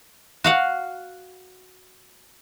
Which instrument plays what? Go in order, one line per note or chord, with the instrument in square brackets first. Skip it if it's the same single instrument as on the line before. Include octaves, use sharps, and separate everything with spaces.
[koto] F#4 F5 F#5